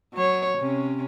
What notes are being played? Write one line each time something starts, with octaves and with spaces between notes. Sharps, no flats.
F#3 C#5
C3 C#4